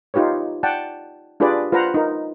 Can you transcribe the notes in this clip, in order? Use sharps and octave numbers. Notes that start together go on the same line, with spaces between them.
D#4 F4 G4 B4 C#5
D5 F#5 G5 A5
D4 F4 G4 G#4 B4 D5
F4 B4 C5 F5 F#5 A#5
D#4 A#4